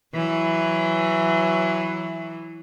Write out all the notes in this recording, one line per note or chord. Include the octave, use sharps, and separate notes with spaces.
E3 F#3